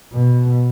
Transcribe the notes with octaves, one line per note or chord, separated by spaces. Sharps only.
B2